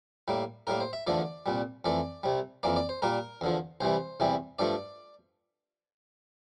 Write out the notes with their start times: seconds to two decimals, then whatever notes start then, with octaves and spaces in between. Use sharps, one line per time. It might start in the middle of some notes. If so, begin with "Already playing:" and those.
0.28 A2 G3 A#3
0.67 A2 G3 A#3 A#4
0.80 C5
0.93 E5
1.07 E2 D3 F3 A3 D5
1.46 C2 A#2 G3
1.85 F2 E3 A3 D5
2.23 C2 C3 G3
2.63 F2 E3 A#3 D5
2.76 D5
2.89 C5
3.02 A#2 G3 A#3 A#4
3.41 E2 D3 F3
3.81 C2 C3 E3 G3 C5
4.20 E2 C3 E3 G3
4.59 G2 F3 A3 D5